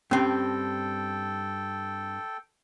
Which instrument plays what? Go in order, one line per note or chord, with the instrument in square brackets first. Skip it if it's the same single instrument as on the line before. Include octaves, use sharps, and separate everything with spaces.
[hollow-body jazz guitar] G2 C4 [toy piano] C#4 [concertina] A4 G5